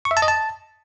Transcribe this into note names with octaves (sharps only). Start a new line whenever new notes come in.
C#6
E5
A5
D#5
A5